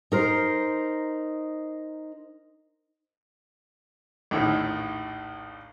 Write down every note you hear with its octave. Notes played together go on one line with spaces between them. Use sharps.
D#4 A#4 C5
A#1 D#2 A2 D#4